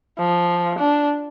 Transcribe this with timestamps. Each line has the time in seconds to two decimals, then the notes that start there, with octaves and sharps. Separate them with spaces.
0.19 F3
0.79 D4